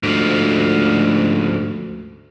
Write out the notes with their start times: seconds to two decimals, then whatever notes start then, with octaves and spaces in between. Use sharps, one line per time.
0.03 D2 G#2 F3